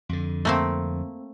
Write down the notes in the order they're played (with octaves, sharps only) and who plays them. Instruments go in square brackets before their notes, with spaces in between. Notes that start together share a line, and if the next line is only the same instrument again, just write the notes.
[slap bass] F2 D3
[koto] A3 A#3 C4